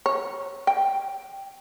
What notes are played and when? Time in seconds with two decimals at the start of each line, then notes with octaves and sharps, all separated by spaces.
0.06 C#5
0.67 G5